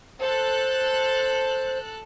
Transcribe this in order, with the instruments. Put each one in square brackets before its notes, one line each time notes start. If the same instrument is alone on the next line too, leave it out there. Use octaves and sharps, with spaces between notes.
[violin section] A4 F#6 [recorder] C5